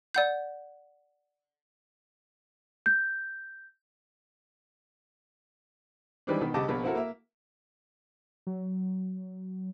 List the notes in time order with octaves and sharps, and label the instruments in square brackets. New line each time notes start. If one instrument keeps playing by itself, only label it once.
[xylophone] D5 F#5 G6
[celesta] G6
[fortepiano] D#3 E3 G3 G#3 C4 D4
B2 D#3
C2 C#3 G4 D#5 A5 D6
A#1 B2 A#3 B5
C4 E4 F#4 A4 A#4
A#3 E5
[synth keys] F#3